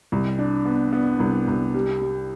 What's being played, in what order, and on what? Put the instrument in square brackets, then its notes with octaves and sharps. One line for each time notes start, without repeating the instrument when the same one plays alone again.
[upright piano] C2
D4
B3
B3
C2
C2
G3
G3